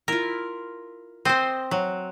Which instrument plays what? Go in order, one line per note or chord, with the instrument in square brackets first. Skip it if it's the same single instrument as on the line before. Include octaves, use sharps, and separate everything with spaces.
[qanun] E4 F4 [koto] A#4
[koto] C4 [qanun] C5 D#5
[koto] F#3